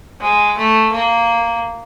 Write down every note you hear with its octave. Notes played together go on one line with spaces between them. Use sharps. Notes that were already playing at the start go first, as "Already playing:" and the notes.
G#3
A3
A#3